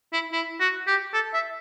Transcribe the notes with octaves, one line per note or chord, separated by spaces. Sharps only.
E4
E4
F#4
G4
A4
E5